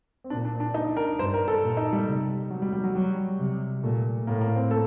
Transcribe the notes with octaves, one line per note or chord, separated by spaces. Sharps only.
C4
A#2 D4
D4
D4
D#4
A#4
G2 C5
A#4
A4
A#2
D#4
G3
C3
F#3
G3
G3
F#3
F#3 G3
C3
A#2 A3
A2 A#3
A#3
C4
A4